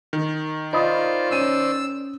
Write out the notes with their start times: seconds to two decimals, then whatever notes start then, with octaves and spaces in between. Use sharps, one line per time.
0.13 D#3
0.73 F4 C5 D5 D#5 B5 D#6
1.31 C#4 E6 D#7